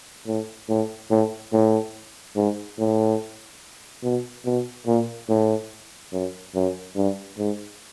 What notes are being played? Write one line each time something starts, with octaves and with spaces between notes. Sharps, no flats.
A2
A2
A2
A2
G#2
A2
B2
B2
A#2
A2
F#2
F#2
G2
G#2